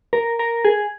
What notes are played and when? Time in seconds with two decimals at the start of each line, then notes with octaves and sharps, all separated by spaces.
0.13 A#4
0.39 A#4
0.65 G#4